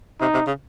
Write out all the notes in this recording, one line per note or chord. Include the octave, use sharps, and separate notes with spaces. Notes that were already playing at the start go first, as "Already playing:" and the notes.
C3 D#4
C3
C#3